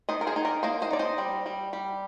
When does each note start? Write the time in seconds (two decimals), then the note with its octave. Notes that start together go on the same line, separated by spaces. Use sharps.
0.09 D#3 C5 D#5
0.21 A#4
0.27 G#4 C5
0.36 D#4
0.45 A#4 D5
0.63 A#3 C5 D#5
0.82 C5 D#5
0.91 D#4 D5
0.99 C5 D#5
1.18 G3
1.46 G3
1.73 G3